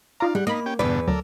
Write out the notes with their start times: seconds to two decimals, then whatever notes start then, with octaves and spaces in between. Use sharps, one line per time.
0.20 D#4 F4 D5 F5 A#5
0.35 G3 G#3 F#5
0.47 A#3 D#4 D#5 B5
0.66 C#4 G4 G5
0.79 E2 G2 B2 D3 B4 D5
1.08 D2 F#3 A4 A#4 D5